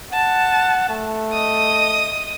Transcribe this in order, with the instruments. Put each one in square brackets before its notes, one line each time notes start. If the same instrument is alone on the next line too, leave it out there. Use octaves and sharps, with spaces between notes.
[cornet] F#5 [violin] A5
[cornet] A3
[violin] D#5 D#6